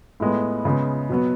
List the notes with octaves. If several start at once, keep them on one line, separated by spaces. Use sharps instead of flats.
A2 G#3 B3
C#3 G#3 B3
B2 F#3 B3